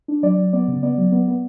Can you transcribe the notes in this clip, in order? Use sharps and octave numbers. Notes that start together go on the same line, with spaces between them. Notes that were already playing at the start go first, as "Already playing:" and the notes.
D4
F#3 D5
F#3
B3 D5
C#3
B3 D5
F#3
B3
B3